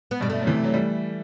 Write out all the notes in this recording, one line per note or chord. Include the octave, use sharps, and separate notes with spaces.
B3
G2 B2 G3
A3
F#3
C3 E3
F#3
E3 G3